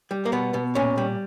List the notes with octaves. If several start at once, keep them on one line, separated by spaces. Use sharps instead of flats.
G3
A#3
B2 B3
B2
A#2 C#4
G3